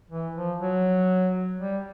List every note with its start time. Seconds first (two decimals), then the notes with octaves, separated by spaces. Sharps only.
0.11 E3
0.36 F3
0.61 F#3
1.60 G3